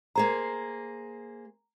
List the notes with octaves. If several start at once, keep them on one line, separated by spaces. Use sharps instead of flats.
A#3 G#4 C5 A#5